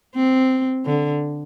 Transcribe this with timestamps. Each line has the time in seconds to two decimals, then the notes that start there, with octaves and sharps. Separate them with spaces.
0.15 C4
0.85 D3